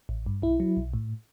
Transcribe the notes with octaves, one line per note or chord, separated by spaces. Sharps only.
A1
G2
B1 E4
F#3
B1
A2